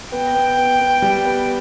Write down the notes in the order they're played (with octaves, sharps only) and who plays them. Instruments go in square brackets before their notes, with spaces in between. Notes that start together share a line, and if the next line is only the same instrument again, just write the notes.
[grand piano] B3 [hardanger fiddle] G5
[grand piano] B3
B3
B3
G3
B3